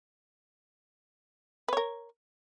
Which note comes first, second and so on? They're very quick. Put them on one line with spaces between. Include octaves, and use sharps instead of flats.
B4 C#5 A#4